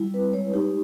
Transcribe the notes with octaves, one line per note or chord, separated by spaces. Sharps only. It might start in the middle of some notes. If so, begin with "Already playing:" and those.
Already playing: G3 E4
C4 B4
G#3 C#5
D#4 G4